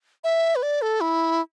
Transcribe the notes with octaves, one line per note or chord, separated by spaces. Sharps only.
E5
B4
D5
A4
E4